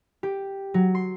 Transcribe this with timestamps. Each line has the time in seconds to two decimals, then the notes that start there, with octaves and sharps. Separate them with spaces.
0.23 G4
0.74 F#3
0.95 C6